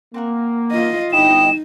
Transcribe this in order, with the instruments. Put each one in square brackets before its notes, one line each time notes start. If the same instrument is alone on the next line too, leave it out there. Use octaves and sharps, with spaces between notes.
[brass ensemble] A#3 [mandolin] C4 F#4 A#4
[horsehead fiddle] F4 D#5
[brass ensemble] G1 E4 D#5 [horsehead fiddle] D#4 [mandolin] G4 G5 B5 [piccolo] E7